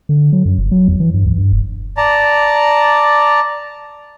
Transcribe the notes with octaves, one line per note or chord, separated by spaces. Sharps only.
D3
F#3
F#2
F#1
F#3
E2
E3
G2
C#2
G2
F1
D5 A5 A#5